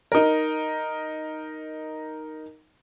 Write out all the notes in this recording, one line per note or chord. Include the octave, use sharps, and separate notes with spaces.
D#4 A#4